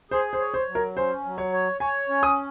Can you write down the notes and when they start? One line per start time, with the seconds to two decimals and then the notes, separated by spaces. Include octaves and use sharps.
0.11 G#4 C5
0.33 C5
0.39 C#5
0.54 C5
0.68 F#3
0.75 A#4
0.96 C#4 C5
1.25 F#3
1.38 C#5
1.53 C#5
1.80 C#5 G#5
2.09 C#4
2.23 D#6